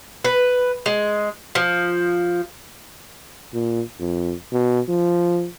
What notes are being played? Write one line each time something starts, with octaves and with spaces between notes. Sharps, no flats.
B4
G#3
F3
A#2
F2
B2
F3